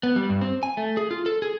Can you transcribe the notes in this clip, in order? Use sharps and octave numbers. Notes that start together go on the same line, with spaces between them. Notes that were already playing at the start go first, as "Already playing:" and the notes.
B3
G3
G2
C4
G#5
A3
G#4
F4
A4
G#4